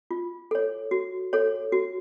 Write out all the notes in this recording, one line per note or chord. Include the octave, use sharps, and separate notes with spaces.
F4
A4 C#5
F#4
A4 C#5
F#4